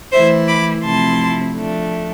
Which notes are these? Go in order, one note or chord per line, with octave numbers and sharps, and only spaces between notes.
E3 A3 E4 C5 E5
B5 D6
C3 F3 A3 C4 E4 A5 C6
F3 A3 D4